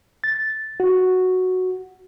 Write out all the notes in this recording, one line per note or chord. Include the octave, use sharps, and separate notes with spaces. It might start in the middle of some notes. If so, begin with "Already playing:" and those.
A6
F#4